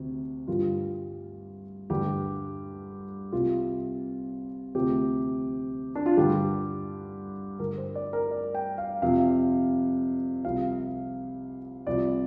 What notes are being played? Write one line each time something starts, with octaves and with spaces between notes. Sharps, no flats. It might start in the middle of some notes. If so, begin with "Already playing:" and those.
Already playing: D2 C3
G2 D3 G3 F4
G2 D3 G3 G4
C2 C3 G3 F4
D2 C3 F3 G4
D4
F4
G2 D3 G3 G4
G2 D3 G3 A#4
C5
D5
A#4
D5
G5
F5
F2 C3 F3 F5
C2 C3 F3 F5
C2 C3 F3 D5